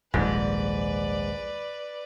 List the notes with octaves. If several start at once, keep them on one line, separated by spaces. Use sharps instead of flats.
D#1 A#1 G#2 B4 D5